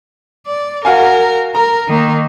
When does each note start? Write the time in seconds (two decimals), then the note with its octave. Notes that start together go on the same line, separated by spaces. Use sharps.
0.47 D5
0.85 F#4 A#4 F5 G#5
1.55 A#4 A#5
1.89 D#3 A#3